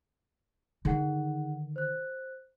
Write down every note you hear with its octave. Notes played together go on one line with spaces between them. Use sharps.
D3 D#3 D#4 G#4 F#5
C5 F#6